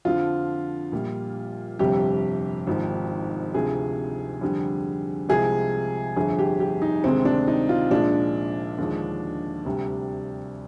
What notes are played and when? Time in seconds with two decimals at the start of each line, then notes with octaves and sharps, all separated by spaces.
0.05 F2 D3 F3 F4
0.92 A#1 A#2 G3
1.79 G1 F2 C3 G3 G4
2.67 G#1 G#2 F3
3.54 D2 C3 F3 G#4
4.41 F2 D3 G3
5.29 C2 C3 F3 G#3 G#4
6.16 G1 F2 D3 G#4
6.39 G4
6.60 G4
6.82 D#4
7.04 D2 C3 D#3 G#3 C4
7.25 D4
7.47 D#4
7.69 F4
7.91 A#1 A#2 F3 G#3 D4
8.78 D#2 D3 F3 G#3
9.65 D2 C3 G3